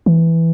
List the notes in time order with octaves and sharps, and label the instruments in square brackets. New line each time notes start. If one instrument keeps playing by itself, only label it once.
[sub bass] E3